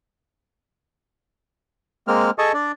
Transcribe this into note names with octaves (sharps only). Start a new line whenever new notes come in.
G#3 A#3 C4 F6
G#4 A4 D#5 A5 C#6
D4 D5